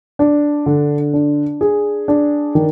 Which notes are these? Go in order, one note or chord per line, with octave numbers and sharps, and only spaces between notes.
D4
D3
D4
G#4
D4
D#3